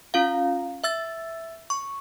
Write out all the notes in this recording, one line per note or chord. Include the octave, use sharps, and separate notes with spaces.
C#4 F4 F5
E5 E6 A6
C#6